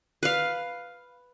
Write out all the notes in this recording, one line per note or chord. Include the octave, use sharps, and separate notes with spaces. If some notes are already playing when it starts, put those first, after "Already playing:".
B4 F5